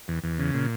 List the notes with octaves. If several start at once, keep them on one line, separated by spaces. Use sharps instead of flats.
E2
E2
C#3
A#2